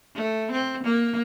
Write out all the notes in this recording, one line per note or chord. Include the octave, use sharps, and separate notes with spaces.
A3
C4
A#3